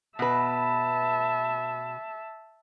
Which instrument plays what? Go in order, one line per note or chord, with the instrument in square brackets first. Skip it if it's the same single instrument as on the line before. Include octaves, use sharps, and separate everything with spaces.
[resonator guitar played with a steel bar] B2 B4 [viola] E5 A5